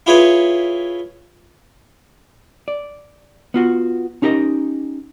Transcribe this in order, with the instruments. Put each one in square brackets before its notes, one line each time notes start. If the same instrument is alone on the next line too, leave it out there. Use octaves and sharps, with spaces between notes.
[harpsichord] E4 F4 G#4 B4 C#5
[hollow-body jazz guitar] D5
B3 F4 F#4
C#4 D#4 G4 A#4 D#5